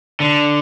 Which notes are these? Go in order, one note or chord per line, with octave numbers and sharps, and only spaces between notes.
D3